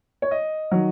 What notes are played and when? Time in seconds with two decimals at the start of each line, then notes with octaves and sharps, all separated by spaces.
0.22 C#5
0.31 D#5
0.71 D#3 F#3